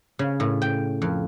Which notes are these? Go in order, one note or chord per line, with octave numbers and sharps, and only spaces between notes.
C#3
A2
G5
F2